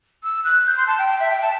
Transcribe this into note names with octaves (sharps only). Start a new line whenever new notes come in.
E6
F#6
G6
C6
A5
G5
G5
E5
G5
A5